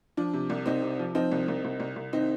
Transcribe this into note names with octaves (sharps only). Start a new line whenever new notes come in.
F3 D4
C3
C2
C2 C4 D#4
C3
F3
F3 C4 D#4
C2
C2
C2
C2
C2
D#3 C4 D#4